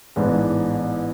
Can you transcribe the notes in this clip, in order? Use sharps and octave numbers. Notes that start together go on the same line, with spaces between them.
A1 G#2 E3 B3 D4